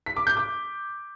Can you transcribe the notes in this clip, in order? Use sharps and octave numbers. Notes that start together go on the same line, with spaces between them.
B6
D6
G6
D6